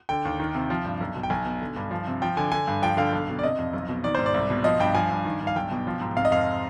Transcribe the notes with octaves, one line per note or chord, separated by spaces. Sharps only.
D3 G5
D#2
D#3
C3
F3
G2
B1
B2
G5
B1 G#5
B2
D3
G2
F3
C3
F3 G5
D3 G#5
D3 G#5
G2
F3 G5
D3 F5
B1
B2
D5
C3 D#5
F2
B1
B2
D#3 D5
G#2 C5
D5
C2
B2
F3 D#5
G2 G5
F3 G#5
G2
D#3
G2
F5
B1 G5
B2
F3
G#2
C3 F5
D#5
F2 F5